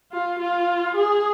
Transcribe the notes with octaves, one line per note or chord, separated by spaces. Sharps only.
F4
F4
G#4